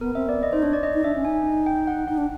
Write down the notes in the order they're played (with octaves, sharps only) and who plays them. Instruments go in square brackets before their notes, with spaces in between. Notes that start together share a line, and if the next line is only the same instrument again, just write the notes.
[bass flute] B3 [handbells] A#4
[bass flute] C4 [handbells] E5
[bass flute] B3 [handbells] D5
[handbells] D#5
[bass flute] D#4 [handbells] C5
[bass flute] D4 [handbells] C#5
[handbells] D5
D#5
[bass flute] D#4
[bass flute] D4 [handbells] E5
[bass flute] C#4
[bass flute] D#4 [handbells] G#5
[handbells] G5
F#5
[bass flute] D#4 [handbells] F#5
[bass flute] D4